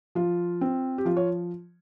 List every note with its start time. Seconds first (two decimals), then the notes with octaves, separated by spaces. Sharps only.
0.15 F3 F4
0.61 C4
0.98 G4
1.05 F3 F4
1.17 C#5